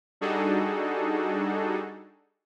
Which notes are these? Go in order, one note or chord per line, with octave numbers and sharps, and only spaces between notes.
G3 D4 D#4 F#4 G#4 A4